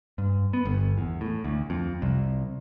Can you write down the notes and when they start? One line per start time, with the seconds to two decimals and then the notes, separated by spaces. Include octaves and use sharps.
0.18 G2
0.53 B3
0.65 G1
0.98 E2
1.21 A2
1.44 D2
1.70 F2
2.02 C2